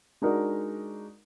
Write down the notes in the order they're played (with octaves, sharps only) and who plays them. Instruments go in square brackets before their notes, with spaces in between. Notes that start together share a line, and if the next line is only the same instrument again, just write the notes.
[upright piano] G#3 D4 D#4 F#4 A#4